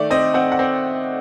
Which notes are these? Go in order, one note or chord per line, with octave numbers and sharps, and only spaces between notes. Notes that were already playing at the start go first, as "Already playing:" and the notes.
Already playing: D#3 A3 D5
C4 D#5
C4 F#5
F#5
C4